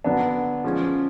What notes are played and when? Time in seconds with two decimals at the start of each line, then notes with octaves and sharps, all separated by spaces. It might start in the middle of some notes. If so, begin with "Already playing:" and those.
0.04 D3 F#3 B3 D4
0.64 F3 G#3 C#4